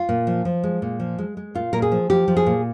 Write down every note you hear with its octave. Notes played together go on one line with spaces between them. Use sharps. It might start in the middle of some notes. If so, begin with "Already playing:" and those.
Already playing: F4
A#2
F3
F3
G#3
A#2
F3
G#3
G#3
A#2 F4
A#2 A#4
G#4
F3
F3 G4
F3
G#4
A#2